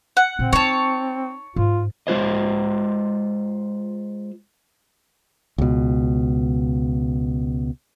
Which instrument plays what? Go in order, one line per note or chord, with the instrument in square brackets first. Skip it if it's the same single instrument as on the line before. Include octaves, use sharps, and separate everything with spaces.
[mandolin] F#5
[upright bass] A#2 D3 [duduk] C4
[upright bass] D#4 [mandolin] C#5 A5
[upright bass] G#2 [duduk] F4
[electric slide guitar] G#3 F4 C5 D#5
[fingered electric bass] C#2 B2